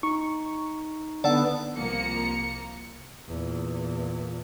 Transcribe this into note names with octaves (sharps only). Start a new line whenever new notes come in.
D#4 C#6
D3 B3 D5 F#5 A5 E6
C2 F3 A#3 A#5 C#7
E2 A#2